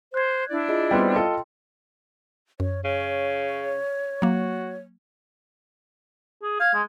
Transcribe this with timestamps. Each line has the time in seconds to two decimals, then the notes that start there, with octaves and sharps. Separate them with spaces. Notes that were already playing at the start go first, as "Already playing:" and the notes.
0.14 C5 F#6 G#6
0.49 D4 E4 D5
0.69 F4 G#4 D#5
0.91 G3 B3 C4 G5 C6
1.16 F4 A4 D#5
2.60 F#2 C#5
2.84 C#3 C#5
4.22 F#3 A#3 F#4
6.42 G#4
6.60 F5 G#6
6.74 G#3